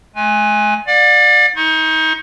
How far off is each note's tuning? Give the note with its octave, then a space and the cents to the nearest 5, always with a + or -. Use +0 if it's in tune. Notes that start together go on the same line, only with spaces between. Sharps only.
G#3 +45 G#5 -10
D5 +15 F#5 -45
D#4 +30 C#6 -45